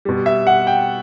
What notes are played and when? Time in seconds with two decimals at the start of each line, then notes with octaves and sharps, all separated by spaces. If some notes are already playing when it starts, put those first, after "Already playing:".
0.05 B2 G3
0.26 E5
0.47 F#5
0.67 G5